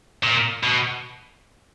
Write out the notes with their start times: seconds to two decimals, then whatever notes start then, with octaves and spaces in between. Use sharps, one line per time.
0.23 A#2
0.63 B2